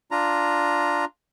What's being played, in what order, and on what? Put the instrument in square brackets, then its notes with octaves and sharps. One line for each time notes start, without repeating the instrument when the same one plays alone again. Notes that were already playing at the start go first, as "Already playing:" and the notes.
[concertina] D4 F4 A#5